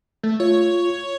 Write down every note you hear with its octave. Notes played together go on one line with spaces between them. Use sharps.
A3
F4 C#5